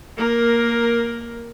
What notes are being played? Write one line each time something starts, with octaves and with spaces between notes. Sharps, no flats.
A#3 A#4